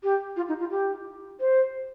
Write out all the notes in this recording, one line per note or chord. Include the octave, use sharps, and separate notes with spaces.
G4
F4
D#4
F4
G4
C5